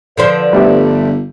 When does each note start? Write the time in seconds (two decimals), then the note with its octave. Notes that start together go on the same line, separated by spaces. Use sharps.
0.17 D3 F3 B4 C5 D5
0.53 G1 G3 A3 G4